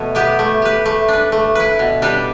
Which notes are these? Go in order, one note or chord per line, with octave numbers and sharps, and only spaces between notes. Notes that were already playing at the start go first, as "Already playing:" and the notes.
Already playing: B2 E3 A3 E4
B3 G4 B4
A3
G4 B4
A3
D4 B4
A3
E4 B4
B2
G3 D4 B4